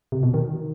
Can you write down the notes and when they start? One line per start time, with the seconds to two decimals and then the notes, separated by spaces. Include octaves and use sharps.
0.12 C3
0.23 B2
0.34 D#3